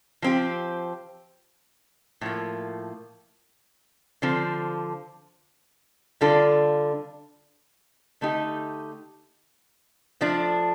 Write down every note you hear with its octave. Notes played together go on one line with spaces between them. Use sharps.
F3 C4 G4
A2 F3 A#3
D3 F3 C4
D3 G3 D4 F4 A4
D3 A3 D#4 G4
F3 A3 D4